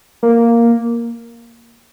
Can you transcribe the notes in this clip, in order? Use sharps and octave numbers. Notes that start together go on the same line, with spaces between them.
A#3